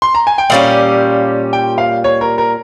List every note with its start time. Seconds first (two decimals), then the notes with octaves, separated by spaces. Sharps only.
0.02 C6
0.15 A#5
0.27 G#5
0.38 G5
0.50 A#2 G3 C#4 G4 F5
1.53 G5
1.78 F5
2.04 C#5
2.21 A#4
2.38 A#4